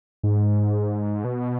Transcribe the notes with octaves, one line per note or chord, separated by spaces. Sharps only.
G#2
B2